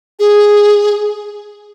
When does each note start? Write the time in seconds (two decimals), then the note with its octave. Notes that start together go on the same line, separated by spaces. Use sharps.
0.19 G#4